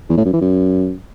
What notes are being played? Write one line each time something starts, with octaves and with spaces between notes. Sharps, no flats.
E2
A2
F#2
E3
F#2